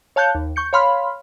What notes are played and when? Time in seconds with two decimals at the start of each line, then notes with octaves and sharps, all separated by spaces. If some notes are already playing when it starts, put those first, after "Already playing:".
0.16 C#5 F5 A5 F#6 G6 C#7
0.35 D#2
0.56 C#6 G6 C#7
0.73 C#5 F5 B5 C6 F6